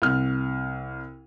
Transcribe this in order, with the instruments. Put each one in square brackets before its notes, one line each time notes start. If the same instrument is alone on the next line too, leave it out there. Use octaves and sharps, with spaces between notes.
[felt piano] C2 F6